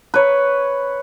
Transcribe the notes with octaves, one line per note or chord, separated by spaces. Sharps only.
B4 C#5